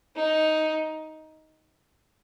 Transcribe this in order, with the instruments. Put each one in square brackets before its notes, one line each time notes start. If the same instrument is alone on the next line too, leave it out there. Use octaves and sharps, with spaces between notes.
[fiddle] D#4